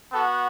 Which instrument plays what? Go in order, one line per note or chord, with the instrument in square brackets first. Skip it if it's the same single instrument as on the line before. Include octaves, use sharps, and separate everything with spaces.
[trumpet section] B3 F#4 A4